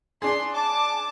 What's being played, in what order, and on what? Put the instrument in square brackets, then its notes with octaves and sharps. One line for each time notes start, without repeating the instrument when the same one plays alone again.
[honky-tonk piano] D4 G#4 [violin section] C6
[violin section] A5 D6